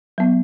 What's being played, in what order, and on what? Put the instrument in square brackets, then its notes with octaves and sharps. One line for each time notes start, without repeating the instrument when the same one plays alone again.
[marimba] F#3 B3